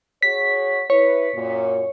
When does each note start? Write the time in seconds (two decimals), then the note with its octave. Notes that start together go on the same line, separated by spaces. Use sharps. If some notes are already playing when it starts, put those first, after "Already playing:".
0.22 F#4 G#4 C#5 B6
0.90 E4 B4 C#5
1.33 F#2 A#2